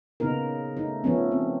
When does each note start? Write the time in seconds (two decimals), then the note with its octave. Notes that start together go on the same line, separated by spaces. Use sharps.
0.20 C#3 A#3 B3 D#4 A#4
0.77 A3 D#4
1.04 F3 A3 B3 C#4
1.32 C4